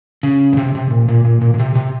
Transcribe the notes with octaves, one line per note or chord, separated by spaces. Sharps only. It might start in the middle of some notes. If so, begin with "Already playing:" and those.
C#3
A#2
C3
C3
A#2
A#2
A#2
A#2
A#2
C3
C3